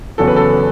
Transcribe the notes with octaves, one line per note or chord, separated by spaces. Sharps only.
E2 C#3 F#3 A4
B4
A4